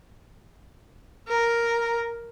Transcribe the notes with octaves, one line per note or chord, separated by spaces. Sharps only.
A#4